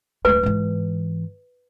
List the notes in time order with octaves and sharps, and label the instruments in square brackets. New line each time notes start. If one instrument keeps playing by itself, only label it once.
[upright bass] D1 A3 [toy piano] B4
[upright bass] G#2 E3